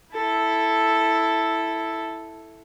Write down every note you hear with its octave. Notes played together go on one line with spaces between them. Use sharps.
E4 A4